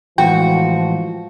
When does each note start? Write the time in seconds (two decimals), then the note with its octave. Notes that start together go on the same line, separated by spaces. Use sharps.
0.18 A2 E3 F3 G#3 F#4 G5